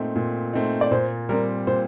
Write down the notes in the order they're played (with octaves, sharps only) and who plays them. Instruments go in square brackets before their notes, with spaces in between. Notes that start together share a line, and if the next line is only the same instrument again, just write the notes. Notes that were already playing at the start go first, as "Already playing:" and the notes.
Already playing: [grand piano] A#2 A3 C4 D#4
A#2
A3 C4 D#4
[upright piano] D5
[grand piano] A#2 [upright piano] C5
[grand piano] G3 C4 [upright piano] A#4
[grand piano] A#2 [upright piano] C5